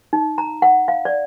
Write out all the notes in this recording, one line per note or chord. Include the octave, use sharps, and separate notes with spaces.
D#4
A#5
F#5
F5
D5